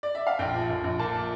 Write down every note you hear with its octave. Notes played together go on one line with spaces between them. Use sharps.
D5
E5
F5
A#1 G5
F3
A#1
A#1
A#2 A5